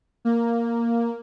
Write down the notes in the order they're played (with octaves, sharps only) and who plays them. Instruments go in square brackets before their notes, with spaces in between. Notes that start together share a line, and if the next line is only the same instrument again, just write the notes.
[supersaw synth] A#3